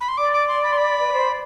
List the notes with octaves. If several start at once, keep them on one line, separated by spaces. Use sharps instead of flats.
B5
C6
D5 D6
D6
C6
B5
C6
B5
B4
C5
D5